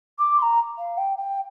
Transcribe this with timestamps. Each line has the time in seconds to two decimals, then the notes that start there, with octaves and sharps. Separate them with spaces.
0.18 D6
0.38 C6
0.42 A#5
0.78 F5
0.97 G5
1.17 G5